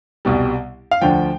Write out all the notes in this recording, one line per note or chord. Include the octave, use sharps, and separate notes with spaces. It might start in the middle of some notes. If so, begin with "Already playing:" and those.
C2 B2 G3
F5
D2 D3 F3 G5